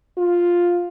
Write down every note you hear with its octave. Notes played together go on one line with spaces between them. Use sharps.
F4